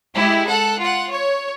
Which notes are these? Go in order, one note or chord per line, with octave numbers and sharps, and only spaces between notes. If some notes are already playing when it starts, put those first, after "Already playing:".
G#3 E4 G4
A4 F#5
F4 F#5
C#5